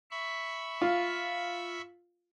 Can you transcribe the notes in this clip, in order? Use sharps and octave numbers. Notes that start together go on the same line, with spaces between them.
E5 B5 C#6
F4